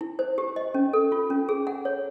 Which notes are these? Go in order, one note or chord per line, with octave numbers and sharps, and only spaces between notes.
E4
C5
G4
D#5
C#4
A4
F4
C#4
G#4
F#5
C#5